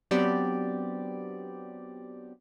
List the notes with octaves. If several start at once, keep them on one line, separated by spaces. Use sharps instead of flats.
F#3 B3 C4 D4 G4 D5